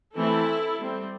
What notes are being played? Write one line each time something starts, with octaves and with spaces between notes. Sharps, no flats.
E3 A3 C4 E4 A4
G3 C4